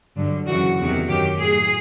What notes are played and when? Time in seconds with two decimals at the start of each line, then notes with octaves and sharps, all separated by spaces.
0.16 G2 D3 F#3
0.46 F#2 C#3 E3 F#4
0.77 E2 C3 D#3 F#4
1.08 F#2 D#3 F#3 G4
1.40 A2 F#3 G#4